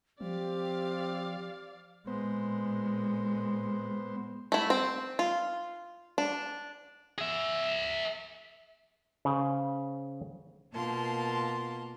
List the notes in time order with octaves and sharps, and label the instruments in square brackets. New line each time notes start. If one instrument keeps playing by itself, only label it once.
[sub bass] F3 [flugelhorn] C4 [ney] G4 [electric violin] D5 F5
[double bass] A#2 G#3 [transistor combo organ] B3 C5
[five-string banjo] A3 E4
C4
F4
D4
[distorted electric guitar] G#4 E5
[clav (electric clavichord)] C#3 C5
[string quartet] B2 A#3 F4 A#4 A5 C6